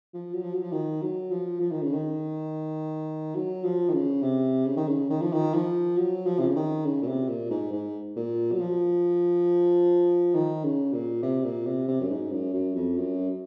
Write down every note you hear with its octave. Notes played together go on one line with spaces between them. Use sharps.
F3
F#3
F3
F#3
F3
D#3
F#3
F3
F3
D#3
C#3
D#3
F#3
F3
D#3
C#3
C3
C#3
D#3
C#3
D#3
F3
D#3
F3
F#3
F3
C3
C#3
D#3
C#3
A#2
C3
A#2
G#2
G#2
A#2
F#3
F3
D#3
C#3
A#2
C3
A#2
C3
C3
F#2
G#2
F#2
F#2
F2
F#2